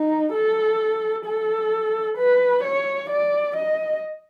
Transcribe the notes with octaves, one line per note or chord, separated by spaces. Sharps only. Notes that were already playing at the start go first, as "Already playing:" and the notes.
Already playing: D#4
A4
A4
B4
C#5
D5
D#5